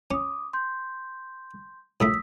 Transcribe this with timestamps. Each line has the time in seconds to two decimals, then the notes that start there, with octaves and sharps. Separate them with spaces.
0.11 C#4 D6 D#6
0.53 C6 G6
2.00 A#1 A2 A3 D#6 E6 B6